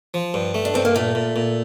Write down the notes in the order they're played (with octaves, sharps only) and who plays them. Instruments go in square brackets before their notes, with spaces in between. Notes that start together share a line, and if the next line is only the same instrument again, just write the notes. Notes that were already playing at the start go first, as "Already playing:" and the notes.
[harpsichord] F3
G2
A3
[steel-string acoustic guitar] D4
[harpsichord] G2 [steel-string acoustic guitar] C4
[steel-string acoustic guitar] A#3
[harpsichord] A#2 [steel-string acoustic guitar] A3
[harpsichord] A#2
A#2